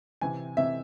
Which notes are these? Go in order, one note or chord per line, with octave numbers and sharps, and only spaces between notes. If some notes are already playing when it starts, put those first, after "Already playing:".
C3 E3 C4 G#5
C3 E3 C4 E5